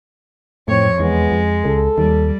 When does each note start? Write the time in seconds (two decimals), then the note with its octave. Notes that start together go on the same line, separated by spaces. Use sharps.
0.68 F2 A2 C4 C#5
1.00 E2 G#3 B3
1.31 F2
1.65 C#2 A4
1.98 D#2 G3